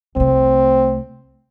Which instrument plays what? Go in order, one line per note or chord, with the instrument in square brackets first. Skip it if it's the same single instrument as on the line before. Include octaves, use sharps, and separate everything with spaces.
[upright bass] C2 A3 [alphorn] C4